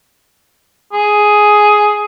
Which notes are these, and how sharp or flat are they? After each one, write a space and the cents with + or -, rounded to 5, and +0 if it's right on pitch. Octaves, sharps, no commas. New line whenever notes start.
G#4 +5